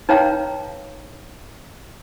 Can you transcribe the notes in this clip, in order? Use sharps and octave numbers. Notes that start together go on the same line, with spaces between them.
D#4 B4 C#5 F5 G5 A#5